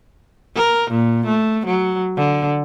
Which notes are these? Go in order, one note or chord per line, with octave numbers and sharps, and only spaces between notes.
A#4
A#2
A3
F#3
D3